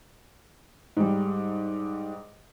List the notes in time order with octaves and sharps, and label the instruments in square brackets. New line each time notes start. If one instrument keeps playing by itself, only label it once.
[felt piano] G#2 G3